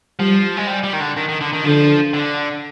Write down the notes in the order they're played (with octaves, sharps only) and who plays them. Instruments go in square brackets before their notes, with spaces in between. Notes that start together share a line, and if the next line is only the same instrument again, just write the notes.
[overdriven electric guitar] F3 [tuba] G3
[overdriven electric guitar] G#3
G3
G3
D#3
D3
D#3
D#3
D3
D#3
[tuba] D3 [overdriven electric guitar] F3
[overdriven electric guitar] D3